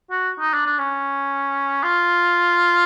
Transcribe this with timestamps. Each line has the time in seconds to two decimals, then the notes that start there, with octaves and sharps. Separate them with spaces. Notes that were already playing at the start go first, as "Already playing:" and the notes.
0.11 F#4
0.40 D#4
0.53 D4
0.66 D4
0.79 C#4
1.83 F4